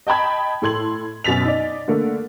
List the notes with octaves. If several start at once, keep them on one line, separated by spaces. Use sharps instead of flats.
D#5 G5 A5 B5 G#6
A2 A4 C6 G#6 F#7
F#2 B2 A6 B6 F7
D#4 D5
D3 A3 A#3